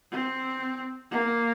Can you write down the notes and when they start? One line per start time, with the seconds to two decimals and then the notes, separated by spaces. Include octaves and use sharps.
0.11 C4
1.11 A#3